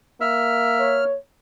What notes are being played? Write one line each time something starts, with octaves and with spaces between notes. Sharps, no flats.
A#3 E5 F6
C#5